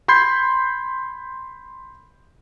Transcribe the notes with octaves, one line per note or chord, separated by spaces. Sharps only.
B5 C6 G6 G#6 C7